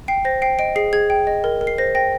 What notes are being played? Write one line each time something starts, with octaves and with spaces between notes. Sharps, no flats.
G5 C7
C5 A#6
G5 C7
D#5 D7
G#4 C7
G#4 G#6
G5
D#5
A#4
A#4
C7
C5 A#6
G5 A#6